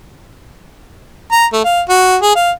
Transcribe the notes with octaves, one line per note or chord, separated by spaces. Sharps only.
A#5
A3
F5
F#4
G#4
F5